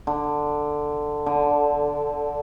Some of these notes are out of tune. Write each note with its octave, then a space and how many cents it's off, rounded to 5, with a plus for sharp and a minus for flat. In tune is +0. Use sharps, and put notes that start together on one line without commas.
D3 +10
D3 -10